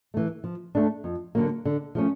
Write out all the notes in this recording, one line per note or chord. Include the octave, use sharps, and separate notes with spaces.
E3 A3
F3
A3 D4
F2
D3 F#3 A#3
D3
F3 A3 C#4